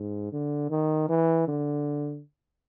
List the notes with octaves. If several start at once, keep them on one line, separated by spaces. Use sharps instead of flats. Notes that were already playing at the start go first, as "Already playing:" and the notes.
Already playing: G#2
D3
D#3
E3
D3